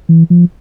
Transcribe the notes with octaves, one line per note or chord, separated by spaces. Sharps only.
E3
F3